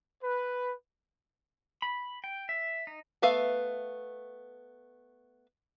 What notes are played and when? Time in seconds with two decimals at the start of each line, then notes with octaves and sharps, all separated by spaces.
0.23 B4
1.82 B5
2.24 G5
2.49 E5
2.87 D#4
3.22 A3 B3 B4 E5 F5